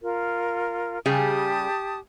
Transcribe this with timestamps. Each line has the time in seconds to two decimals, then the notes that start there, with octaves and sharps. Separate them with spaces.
0.02 F4 A#4
1.06 C#3 G3 G4 G#4 A5 D#6